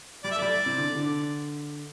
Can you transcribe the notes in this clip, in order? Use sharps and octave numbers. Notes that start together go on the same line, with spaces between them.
G3 D5
E5
A3
G3 D5
C3
D3
D3